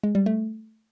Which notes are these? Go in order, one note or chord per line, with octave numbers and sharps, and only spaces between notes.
G#3
G3
A3